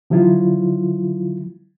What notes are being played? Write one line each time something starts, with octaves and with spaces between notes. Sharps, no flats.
D3 F3 F#3 E4 F4